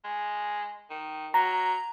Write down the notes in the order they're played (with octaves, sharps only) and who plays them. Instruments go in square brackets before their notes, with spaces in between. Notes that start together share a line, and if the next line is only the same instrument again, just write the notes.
[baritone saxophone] G#3
D#3
[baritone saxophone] F#3 [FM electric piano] A#5